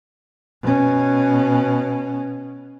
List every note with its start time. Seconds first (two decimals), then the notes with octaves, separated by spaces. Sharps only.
0.62 B2 C#4